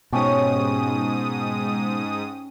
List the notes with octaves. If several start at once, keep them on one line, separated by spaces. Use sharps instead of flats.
G#2 B2 C#4 G4 A5 D#6